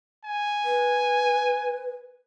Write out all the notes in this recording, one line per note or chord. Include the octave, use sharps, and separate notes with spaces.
G#5
B4